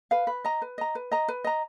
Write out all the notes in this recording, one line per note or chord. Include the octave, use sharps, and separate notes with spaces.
B4 F5
B4
D#5 A#5
B4
D#5 A#5
B4
D#5 A#5
B4
D#5 A#5